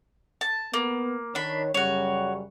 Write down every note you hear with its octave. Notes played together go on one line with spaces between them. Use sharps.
A5
A#3 B3
D#3 D4 C#5 B5
F#2 C#3 G3 F#4 C#5